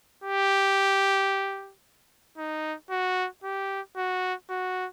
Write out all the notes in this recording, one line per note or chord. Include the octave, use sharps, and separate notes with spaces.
G4
D#4
F#4
G4
F#4
F#4